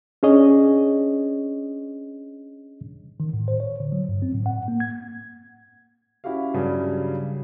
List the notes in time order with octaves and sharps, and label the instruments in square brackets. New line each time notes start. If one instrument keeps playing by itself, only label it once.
[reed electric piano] C#4 D4 G#4 C#5 D#5
[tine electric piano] D#3
A2
C5
C#5
D3
F#3
G2
C4
A2
F#5
A#3
G#6
[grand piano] C#4 E4 F#4 G4 F5
G2 C#3 F#3 G3